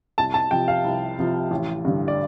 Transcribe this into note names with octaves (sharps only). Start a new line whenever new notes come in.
C2 A5
A5
C3 F3 G5
F5
C2
C3 F3
A1
G2 D3
D5